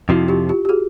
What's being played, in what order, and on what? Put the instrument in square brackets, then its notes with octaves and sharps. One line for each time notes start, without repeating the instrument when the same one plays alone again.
[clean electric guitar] F2 C3 F3 [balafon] E4 F#4
[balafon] F4 G4
F4 G4
G4
F#4 G#4